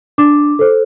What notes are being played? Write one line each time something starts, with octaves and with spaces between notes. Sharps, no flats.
D4 D6
A4 C5